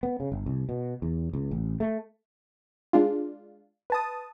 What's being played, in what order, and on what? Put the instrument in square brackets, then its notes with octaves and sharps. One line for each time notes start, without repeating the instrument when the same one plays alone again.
[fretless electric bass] B3
C#3
G1
C2
B2
E2
C#2
A1
A3
[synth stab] G#3 D4 F4
B4 A5 D#6